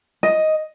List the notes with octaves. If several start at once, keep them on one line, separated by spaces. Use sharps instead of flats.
D#5